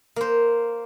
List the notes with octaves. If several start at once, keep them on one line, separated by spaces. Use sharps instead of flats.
A#3 C5